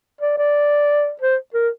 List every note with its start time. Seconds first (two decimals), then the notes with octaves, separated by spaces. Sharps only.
0.21 D5
0.38 D5
1.22 C5
1.54 A#4